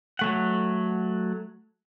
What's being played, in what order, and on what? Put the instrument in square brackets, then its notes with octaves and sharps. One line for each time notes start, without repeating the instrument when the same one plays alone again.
[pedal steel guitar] F#3 A3 F#5